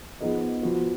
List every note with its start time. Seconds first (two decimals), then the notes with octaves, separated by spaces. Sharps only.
0.21 F3 B3 D#4 G#4 D#5
0.63 F3 B3 F#4